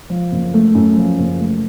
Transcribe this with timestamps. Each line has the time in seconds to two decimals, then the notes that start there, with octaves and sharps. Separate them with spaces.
0.10 F3
0.32 F#1
0.54 A3
0.75 F#2
0.97 F3
1.19 F#1
1.40 A3